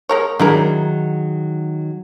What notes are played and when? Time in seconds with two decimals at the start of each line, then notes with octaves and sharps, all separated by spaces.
0.09 G#3 A#4 C#5
0.40 D#3 F#3 D4 E4 G#4 A#4